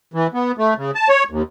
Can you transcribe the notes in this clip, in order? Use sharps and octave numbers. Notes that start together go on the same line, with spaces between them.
E3
B3
A3
C#3
A5
C#5
D#2